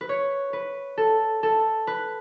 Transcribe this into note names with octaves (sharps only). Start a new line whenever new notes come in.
B4
C#5
B4
A4
A4
B4